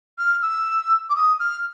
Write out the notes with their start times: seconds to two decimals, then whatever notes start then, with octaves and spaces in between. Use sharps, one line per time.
0.18 F6
0.42 E6
1.09 D6
1.15 D#6
1.40 F6